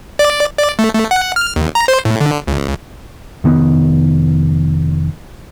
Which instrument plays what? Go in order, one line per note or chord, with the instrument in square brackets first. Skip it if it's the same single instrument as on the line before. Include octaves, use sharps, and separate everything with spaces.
[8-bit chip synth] D5
D5
A3
A3
F#5
F6
D#2
A#5
C5
A2
D3
C#2
[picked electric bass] F1 D#3 B3